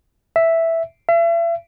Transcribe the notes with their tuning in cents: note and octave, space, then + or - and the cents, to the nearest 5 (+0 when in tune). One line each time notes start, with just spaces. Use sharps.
E5 +0
E5 +40